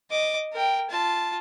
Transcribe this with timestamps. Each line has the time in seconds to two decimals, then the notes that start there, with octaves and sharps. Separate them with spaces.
0.10 D#5 D6
0.52 A#4 G5
0.89 F4 A5